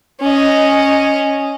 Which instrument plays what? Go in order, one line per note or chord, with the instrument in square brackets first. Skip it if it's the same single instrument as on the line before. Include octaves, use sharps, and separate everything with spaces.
[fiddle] C#4 D#5